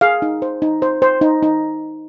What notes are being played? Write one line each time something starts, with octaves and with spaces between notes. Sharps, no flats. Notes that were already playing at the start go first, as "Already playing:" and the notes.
G#4 F5
D#4
C5
D#4
C5
C5
D#4
D#4